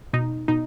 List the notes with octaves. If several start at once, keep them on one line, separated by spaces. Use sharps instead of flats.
B2 D#4
B2 D#4